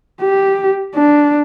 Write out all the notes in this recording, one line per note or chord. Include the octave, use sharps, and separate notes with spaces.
G4
D4